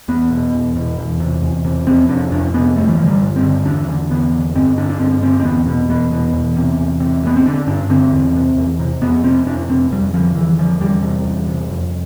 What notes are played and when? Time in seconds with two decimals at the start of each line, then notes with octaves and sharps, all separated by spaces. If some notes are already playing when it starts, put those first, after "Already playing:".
0.08 E2 B3
0.31 B2
0.54 E2
0.76 B2
0.98 E2
1.20 C3
1.42 E2
1.64 C3
1.87 F2 C4
2.09 C3 D4
2.31 F2 D4
2.54 C3 B3
2.76 G2 A3
2.89 E3
2.97 D3 F3
3.07 G3
3.21 G2
3.36 C4
3.43 D3
3.66 E2 D4
3.88 D3
4.10 E2 B3
4.33 D3
4.55 G2 C4
4.77 D3 D4
4.90 D4
5.00 G2 C4
5.22 D3 C4
5.40 C4
5.45 E2 B3
5.66 B2 B3
5.89 E2 B3
6.11 B2 B3
6.34 E2
6.56 C3
6.79 E2
7.00 C3
7.23 G2
7.27 B3
7.37 C4
7.45 D3 D4
7.67 G2 D4
7.90 D3 C4
8.12 E2
8.35 C3
8.57 E2
8.80 C3
9.01 F2 B3
9.24 C3 C4
9.46 F2 D4
9.69 C3 C4
9.92 F2 G3
10.13 D3 F3
10.35 F2 E3
10.58 D3 F3
10.80 E2 G3
11.03 C3
11.25 E2
11.47 C3
11.70 F2